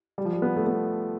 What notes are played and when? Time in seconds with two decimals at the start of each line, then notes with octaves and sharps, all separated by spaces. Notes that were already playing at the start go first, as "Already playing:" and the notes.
0.18 G3
0.25 F3
0.33 G3
0.42 B3
0.56 A3
0.67 B3